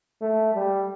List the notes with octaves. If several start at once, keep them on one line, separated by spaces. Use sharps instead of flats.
A3
G3